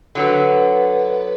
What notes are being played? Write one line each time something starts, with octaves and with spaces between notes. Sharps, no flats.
D3 F#3 B3